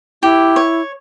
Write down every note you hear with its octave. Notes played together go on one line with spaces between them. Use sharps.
E4 G4
C#5